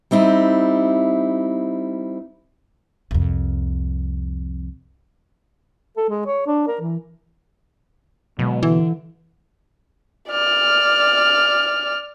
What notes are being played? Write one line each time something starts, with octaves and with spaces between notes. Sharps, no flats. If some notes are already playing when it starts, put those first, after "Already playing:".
G3 C4 D#4 E4
C2 F2
A4
G#3
C#5
D4
A#4
E3
B2 D3 F#3 G#3
D3 E3
D5 F6